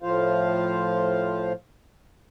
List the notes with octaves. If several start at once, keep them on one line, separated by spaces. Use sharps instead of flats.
A2 F3 F4 C5 F5